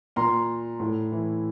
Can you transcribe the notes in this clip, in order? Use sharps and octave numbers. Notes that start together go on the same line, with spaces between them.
A#2 A#5 C6
A2
E3